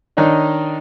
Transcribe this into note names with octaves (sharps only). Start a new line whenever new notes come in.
D#3 D4 D#4 C#5 D#5